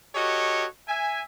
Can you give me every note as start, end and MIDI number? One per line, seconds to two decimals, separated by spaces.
0.15 0.66 66
0.15 0.66 67
0.15 0.66 69
0.15 0.66 73
0.15 0.66 75
0.88 1.22 76
0.88 1.22 80